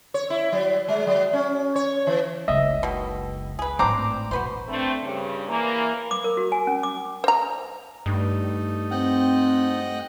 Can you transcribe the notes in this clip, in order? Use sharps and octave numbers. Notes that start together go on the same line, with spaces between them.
C#5
E4
F#3
G#3
F#3
C#4
C#5
E3
F#1 C#2 D#5 E5
B2 D#3
G#4 B4
G#1 A2 C4 D4 C5 A#5 D6
B1 E2 F#4 B4 C5
A3 C4 D4
G2 C#3
E3 A#3
D6
A#4
F#4
G#5
C#4
D6
C5 A#5
G2 A3 D#4
C4 D#5 F#5 G5